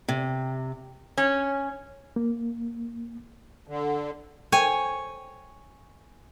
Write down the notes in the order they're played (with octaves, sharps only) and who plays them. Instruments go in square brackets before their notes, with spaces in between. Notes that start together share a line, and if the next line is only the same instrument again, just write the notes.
[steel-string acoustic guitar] C3
[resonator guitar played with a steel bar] C#4
[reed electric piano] A#3
[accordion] D3
[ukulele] A4 C5 G5 [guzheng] C#5 G#5